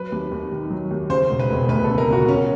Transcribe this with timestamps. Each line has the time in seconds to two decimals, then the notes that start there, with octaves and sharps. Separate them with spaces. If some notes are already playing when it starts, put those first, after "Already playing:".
Already playing: F#3 B4
0.12 D#2
0.32 D#2
0.52 D#3
0.70 F#3
0.91 D#2
1.10 C#3 C5
1.29 E1
1.39 B4
1.50 E1
1.68 D2 B4
1.84 A4
1.89 C#3
1.98 A#4
2.08 E1 F#4
2.28 C#3 C#4